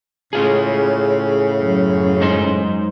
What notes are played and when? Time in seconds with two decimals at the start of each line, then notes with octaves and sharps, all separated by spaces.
0.33 A2 C#3 C#4 F4 G#4
1.62 F#2
2.21 G#2 D#4 C5